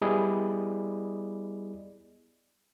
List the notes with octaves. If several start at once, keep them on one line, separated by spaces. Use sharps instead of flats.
G3 B3 E4 G#4 D5 D#5